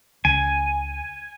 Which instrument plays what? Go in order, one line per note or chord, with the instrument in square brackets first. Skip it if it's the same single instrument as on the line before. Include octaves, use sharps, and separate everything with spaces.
[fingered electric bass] C#2 [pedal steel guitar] G#5